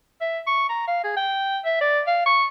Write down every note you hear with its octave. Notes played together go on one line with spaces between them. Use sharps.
E5
C#6
A#5
F5
G#4
G5
E5
D5
F5
C#6